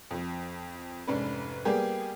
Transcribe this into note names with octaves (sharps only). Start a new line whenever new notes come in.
F2 F3
F1 G#2 C#4 D4 B4
G3 A#3 B3 G4 G#4